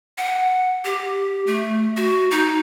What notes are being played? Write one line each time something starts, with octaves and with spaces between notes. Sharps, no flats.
F#5
G4
A3
F#4
D#4